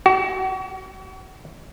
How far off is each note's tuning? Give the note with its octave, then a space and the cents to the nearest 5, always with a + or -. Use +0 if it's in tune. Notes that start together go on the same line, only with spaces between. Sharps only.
F#4 +35